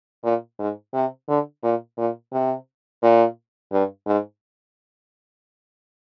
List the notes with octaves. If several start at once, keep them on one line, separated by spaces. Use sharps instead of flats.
A#2
G#2
C3
D3
A#2
A#2
C3
A#2
G2
G#2